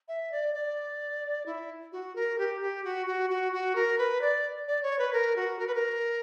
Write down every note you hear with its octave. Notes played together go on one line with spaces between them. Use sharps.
E5
D5
D5
E4
F#4
A#4
G4
G4
F#4
F#4
F#4
F#4
A#4
B4
D5
D5
C#5
B4
A#4
F#4
A#4
B4
A#4